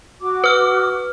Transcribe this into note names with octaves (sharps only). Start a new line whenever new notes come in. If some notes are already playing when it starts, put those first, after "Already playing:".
F#4 D6
B4 F6